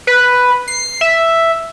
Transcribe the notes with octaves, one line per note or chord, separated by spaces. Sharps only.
B4
C7
E5